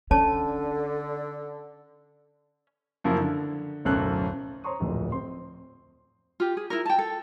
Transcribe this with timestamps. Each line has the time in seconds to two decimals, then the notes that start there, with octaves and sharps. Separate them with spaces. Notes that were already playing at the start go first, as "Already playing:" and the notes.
0.11 D3 C#4 C#5 A5
3.04 F#2 C#3 F3 F#3 A#3 E4
3.20 D3
3.85 D1 B1 F#2 A4 F#6
4.64 C5 C#5 A#5 C6 C#6 D#6
4.80 D1 F2 A#2
5.12 C4 C6
6.40 F4 G4
6.57 G#4
6.70 E4 F4 A#4
6.86 G5 A5
6.98 A4